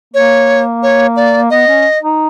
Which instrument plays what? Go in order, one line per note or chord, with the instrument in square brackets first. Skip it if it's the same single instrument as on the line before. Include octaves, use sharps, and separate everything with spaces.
[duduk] A#3 [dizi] C#5
[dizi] C#5
D5
[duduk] B3 [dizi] D#5
[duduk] C#4
D#4